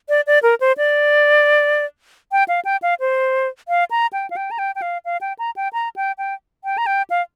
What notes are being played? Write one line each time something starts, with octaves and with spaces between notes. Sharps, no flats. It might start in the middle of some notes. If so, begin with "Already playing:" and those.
D5
D5
A#4
C5
D5
G5
F5
G5
F5
C5
F5
A#5
G5
F5
G5
A#5
G5
G5
F5
F5
G5
A#5
G5
A#5
G5
G5
G5
A#5
G5
F5